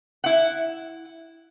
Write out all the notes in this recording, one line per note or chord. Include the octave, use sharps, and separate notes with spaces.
E4 F#5